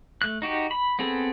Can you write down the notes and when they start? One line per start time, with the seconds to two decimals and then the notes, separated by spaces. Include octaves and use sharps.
0.22 A3 F#6
0.42 D#4 F#4 G4
0.71 B5
0.99 B3 C4 G#4 A4